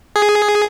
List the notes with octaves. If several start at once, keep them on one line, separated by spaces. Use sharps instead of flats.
G#4